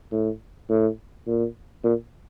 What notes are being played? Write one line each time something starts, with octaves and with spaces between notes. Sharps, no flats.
A2
A2
A#2
A#2